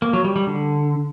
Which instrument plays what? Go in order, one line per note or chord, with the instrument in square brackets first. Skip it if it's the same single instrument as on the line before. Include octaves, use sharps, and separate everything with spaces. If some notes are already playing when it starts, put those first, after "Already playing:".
[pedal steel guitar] A#3
F#3
G3
G3
D3